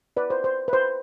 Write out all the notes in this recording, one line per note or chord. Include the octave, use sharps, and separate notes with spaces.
B4 D5
C5
C5
B4
C5